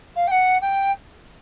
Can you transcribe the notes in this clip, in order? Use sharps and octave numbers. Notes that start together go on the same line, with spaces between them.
F5
G5
F#5
G5